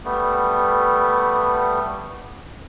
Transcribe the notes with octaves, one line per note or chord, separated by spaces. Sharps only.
G3 A3 B3